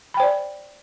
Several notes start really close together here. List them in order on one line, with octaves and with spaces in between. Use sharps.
B5 G5 C5 D5